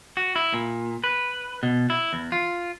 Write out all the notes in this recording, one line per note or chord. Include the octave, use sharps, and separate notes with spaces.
F#4
E4
A#2
B4
B2
E4
E2
F4